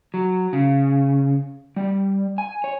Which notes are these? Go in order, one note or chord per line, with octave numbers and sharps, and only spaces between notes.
F#3
C#3
G3
G#5
C#5